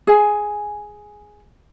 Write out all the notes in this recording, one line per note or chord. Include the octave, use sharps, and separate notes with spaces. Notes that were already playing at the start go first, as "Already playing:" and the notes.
G#4 G#5